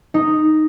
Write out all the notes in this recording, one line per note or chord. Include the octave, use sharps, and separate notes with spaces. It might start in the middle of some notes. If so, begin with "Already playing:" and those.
D#4